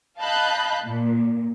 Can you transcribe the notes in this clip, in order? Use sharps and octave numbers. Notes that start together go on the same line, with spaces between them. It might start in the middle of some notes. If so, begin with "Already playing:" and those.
D#5 F5 A5 B5 F#6 G6
A#2